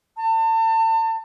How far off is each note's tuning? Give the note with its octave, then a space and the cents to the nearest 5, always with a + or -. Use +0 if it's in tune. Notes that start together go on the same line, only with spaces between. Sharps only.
A5 +35